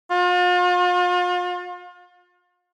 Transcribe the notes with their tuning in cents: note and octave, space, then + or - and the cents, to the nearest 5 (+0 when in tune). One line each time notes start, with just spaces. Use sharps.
F4 +40